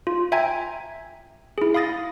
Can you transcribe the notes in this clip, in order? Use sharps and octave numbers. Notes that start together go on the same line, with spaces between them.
F4
E5 G5 G#5 A#5 G#6
E4 G#4
F5 B5 D#6 A6 A#6